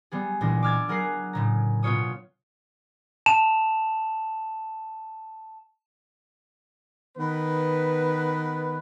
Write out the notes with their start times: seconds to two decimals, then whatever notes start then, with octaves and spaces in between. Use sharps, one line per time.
0.12 G3 B3 G#4
0.41 C#2 A#2 E3 G#3 D4 A#6
0.62 D6 E6 F6 G#6 A6
0.88 F#3 G#4 A#4 F6 F#6 C7
1.33 A2 C#3 A#5
1.83 B2 B3 F4 C#5 D#6
3.26 A5 E7 F7
7.17 D#3 B3 B4